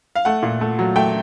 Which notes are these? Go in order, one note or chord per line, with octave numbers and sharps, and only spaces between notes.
F5
A3 F#5
A#2
A3
F#3
A3 G5